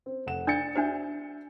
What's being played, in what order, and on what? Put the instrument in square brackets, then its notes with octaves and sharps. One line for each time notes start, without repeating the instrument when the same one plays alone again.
[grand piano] C4
F1 F#5 E7
[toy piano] D4 D5 [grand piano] G6 A6 C#7
[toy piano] D4 F#4 C5 [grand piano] E5 G#5 G6